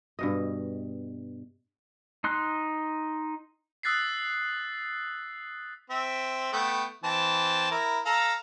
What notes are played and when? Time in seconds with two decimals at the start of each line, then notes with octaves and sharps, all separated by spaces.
0.19 G2 B2 D#5
2.24 D#4 C6 F#6
3.83 D#6 E6 F#6 A6 B6 C7
5.90 C4 E5
6.53 A3 B3 G5
7.04 E3 C4 A5
7.71 E4 A#4
8.05 A4 F5 A#5